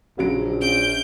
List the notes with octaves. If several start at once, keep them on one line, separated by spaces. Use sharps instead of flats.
A#1 C#3 F#3 D7
C#4 G6 D7